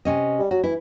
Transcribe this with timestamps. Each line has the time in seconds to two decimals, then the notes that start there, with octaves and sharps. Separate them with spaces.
0.05 C3 C#4 D#5
0.39 G3
0.51 F#3 F#4
0.63 E3 E4